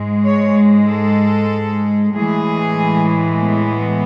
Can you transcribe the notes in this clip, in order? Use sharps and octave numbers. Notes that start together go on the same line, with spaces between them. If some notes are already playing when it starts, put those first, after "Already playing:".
Already playing: G#2 G#3
C#5
A4
A2 E3 G#3 G#4
B3